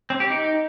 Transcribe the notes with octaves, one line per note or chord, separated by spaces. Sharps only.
C4
G4
D#4